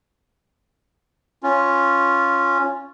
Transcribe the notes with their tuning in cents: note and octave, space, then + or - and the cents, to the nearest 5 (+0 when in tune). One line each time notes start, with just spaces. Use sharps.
C#4 +0 F4 +0